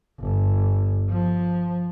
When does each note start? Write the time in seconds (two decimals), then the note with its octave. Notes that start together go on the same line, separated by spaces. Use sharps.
0.20 G1
1.09 F3